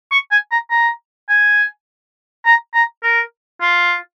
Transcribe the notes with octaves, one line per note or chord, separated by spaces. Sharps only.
C#6
G#5
A#5
A#5
G#5
A#5
A#5
A#4
F4